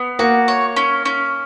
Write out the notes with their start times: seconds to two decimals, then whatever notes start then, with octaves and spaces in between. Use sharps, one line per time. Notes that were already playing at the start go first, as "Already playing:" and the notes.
Already playing: B3
0.19 A#3 F#4
0.48 C#5
0.76 C#4
1.05 C#4